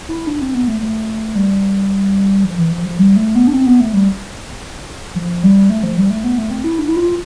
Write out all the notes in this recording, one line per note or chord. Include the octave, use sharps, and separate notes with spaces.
E4
D4
C4
B3
A3
A3
G3
F3
E3
F3
F3
G3
A3
B3
D4
C4
B3
A3
G3
F3
G3
A3
F3
G3
A3
B3
A3
C4
E4
D4
E4
F4